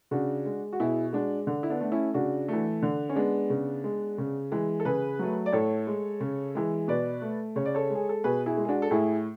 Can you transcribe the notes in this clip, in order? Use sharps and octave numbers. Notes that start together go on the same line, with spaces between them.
C#3 D4 F#4
G#3
F#4
B2 E4 G#4
G#3 D4 F#4
D3
E4
B3 D4
A3
C#4 E4
C#3 D4 F#4
E3 A3
D3
C#4
G#3 B3 D4
C#3
G#3
C#3
E3 G#3
A4
C#3 G#4 B4
F#3 A3
D5
A2 A4 C#5
G#3
C#3
E3 G#3
B2 B4 D5
A3
C#3 C#5
D5
A4 C#5
G#3
G#4
A4
B2 G#4 B4
E4 G#4
G#3
G#4
D4 F#4
A4
A2 E4 G#4